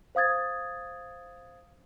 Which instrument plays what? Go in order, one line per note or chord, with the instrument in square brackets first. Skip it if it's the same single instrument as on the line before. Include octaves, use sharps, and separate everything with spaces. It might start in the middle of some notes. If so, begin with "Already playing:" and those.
[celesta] C5 F5 D#6 G#6 A6